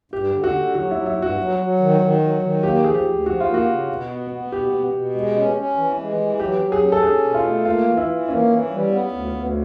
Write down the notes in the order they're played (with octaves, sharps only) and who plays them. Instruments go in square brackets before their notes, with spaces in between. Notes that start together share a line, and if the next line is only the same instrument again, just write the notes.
[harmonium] G2 [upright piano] G4
[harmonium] D3
[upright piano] F#4
[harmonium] D3
[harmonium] F#3 [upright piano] F#4
[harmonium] F#3 [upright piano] E4
[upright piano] E4
[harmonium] G2
[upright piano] F#4
[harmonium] F#3
F#3
D#3
D#3
F#3
D#3
[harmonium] A#3 [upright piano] G4
[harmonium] F3 [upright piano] G#4
[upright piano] G4
[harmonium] D2
[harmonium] F3 [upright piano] F#4
[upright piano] F4
[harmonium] A#3
[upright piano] F#4
[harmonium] C#3
B2
B3
B3
[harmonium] B2 [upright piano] G4
[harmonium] B2
B2
G#3
C#4
C#4
E3
G#3
E3
[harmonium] F#3 [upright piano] G4
[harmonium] F#3
[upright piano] G#4
[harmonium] C#4
[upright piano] A4
[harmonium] C#4 [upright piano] G#4
[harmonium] B2
[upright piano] F4
[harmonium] A3
[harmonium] A#3 [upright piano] F4
[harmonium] E3
[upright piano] E4
[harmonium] E3
[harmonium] A#3 [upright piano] C#4
[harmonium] E3
G3
B3
D2
D2